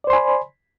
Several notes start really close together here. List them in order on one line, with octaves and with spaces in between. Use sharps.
D5 C5 C6 G#5 B5